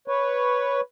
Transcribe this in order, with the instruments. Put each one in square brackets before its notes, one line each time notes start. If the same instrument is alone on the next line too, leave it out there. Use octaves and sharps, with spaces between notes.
[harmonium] B4 C#5